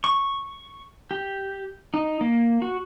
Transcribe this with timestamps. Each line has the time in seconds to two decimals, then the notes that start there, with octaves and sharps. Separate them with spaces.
0.04 C#6
1.11 G4
1.94 D#4
2.21 A#3
2.62 F#4